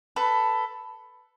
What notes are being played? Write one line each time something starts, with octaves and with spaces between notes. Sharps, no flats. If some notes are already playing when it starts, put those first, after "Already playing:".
A4 B4